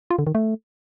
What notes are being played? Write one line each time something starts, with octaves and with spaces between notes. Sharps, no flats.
F4
D3
D#3
A3